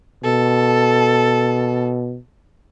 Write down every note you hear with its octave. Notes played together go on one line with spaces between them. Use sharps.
B2 A4